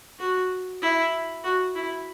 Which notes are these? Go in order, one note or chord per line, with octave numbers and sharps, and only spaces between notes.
F#4
E4
F#4
E4